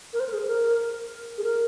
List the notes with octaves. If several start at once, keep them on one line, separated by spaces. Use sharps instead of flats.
A#4
C5
A#4
G#4
A#4
G#4
A#4